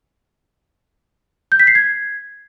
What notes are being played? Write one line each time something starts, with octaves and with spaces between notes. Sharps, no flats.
G6
B6
C7
G#6